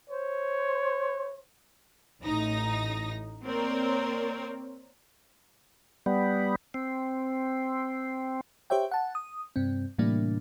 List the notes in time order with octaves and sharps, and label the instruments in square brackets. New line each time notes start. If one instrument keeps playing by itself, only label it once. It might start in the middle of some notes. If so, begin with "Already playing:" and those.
[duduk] C5 [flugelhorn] C#5
[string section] A1 D#4 A#6
A#3 C4 A#4 C#5 D5
[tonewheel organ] G3 B3
C4
[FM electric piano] G4 C5 C#5 E5 G5
F#5 A5
D#6
G2 C3 C4
A2 C3 E3 G3 A#3 D4